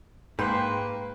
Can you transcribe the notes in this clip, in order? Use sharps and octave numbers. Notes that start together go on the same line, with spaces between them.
G#2 A#3 B4 G5 C6